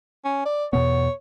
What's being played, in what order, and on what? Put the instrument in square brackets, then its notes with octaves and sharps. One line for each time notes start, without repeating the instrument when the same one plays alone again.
[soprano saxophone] C#4
D5
[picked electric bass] E2 B2 B3 [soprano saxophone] C#5